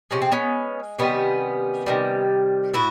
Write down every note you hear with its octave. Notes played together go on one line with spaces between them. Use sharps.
C3 F3 G#3 C#4
C4
B3 C#4
C3 D#3 G3 B3 C#4
C3 D#3 G3
A2 E4 F#4